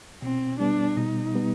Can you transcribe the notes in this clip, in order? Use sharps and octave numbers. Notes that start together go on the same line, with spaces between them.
B2 C4
G3 B3 D4
B2 D#4
G3 B3